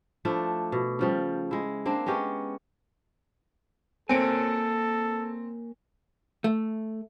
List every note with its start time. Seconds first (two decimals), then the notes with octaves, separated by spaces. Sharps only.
0.25 F3 A3 D4 E4
0.72 B2
0.99 C#3 F3 G3
1.51 G#3 E4
1.86 A#3 C4 D4
2.06 G#3 B3 C#4 G4
4.09 A#3 C4 A4 C#5 G#5 D7
6.44 A3